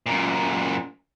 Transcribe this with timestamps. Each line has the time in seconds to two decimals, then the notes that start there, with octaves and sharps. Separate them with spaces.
0.06 F#2 A#2